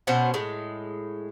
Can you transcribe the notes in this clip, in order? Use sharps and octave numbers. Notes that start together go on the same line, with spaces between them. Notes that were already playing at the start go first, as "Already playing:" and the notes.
B2 C#4 C5 F#5
A2 G#3